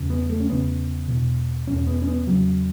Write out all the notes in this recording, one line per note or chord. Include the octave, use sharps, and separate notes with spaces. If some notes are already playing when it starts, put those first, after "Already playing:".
Already playing: E2 C#3
B3
A3
C#4
E2 C#3 B3
E2 B2
E2 B2 C#4
B3
C#4
B3
E2 C#3 F#3